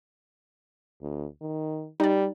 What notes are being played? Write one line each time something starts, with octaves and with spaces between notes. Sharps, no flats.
D2
D#3
G3 D#4 D5